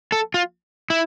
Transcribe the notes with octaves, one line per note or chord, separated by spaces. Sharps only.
A4
F4
E4